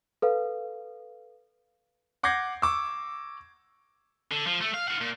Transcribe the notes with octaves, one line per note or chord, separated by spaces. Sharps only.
A4 B4 F5
F#5 D6 G6 G#6 A#6 C7
C#6 D6 E6
D3
F3
A3
F5
F4 F#5
A#2